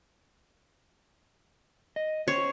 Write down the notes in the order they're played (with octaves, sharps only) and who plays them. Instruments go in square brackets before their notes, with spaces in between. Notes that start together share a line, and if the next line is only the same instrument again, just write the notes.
[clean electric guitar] D#5
[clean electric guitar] C#4 C5 [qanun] C#5